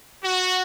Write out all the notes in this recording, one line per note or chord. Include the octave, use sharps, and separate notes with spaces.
F#4